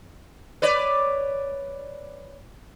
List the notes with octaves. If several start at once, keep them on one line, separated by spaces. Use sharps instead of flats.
B4 C#5 D5